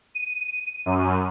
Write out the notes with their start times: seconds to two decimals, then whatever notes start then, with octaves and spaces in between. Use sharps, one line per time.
0.14 D#7
0.86 F#2